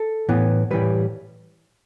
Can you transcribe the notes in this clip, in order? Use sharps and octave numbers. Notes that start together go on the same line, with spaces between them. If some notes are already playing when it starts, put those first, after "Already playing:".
Already playing: A4
A2 E3 B3
A2 E3 G3 B4